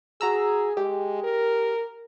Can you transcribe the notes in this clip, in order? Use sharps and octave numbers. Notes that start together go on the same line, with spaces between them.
F#4 G#4 A#5 E6
G#3 G4
A#4